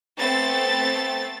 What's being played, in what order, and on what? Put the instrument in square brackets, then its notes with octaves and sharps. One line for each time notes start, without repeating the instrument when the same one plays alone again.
[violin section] A3 B3 C4 A6